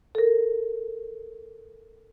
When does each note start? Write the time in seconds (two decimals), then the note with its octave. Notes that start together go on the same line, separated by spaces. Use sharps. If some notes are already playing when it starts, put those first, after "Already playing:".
0.15 A4 A#4